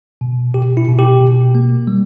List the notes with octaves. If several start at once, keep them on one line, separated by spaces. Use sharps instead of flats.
B2
B2 G4
E4
B2
G4
B2
A#3
G3